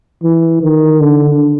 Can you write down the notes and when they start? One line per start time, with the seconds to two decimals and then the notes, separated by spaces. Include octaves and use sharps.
0.23 E3
0.62 D#3
1.00 D3